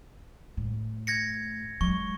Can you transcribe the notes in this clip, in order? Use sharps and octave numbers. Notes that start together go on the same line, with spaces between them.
A2
G#6 A#6 C#7
F#3 G#3 C#6